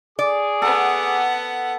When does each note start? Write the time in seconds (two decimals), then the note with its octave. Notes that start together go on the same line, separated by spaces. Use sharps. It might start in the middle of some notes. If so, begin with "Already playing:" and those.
0.19 G#4 D5 D6
0.62 B3 A4 F#5